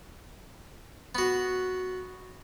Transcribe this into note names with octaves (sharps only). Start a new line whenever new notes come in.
B3 F#4